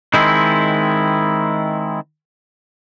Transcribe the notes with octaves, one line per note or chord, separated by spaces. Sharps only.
D#3 G#3 C4 E4